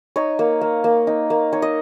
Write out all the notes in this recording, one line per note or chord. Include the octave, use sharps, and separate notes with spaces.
D#4 C#5
A#3
A#3
A#3
D#4
A#3
D#4 C#5
D#5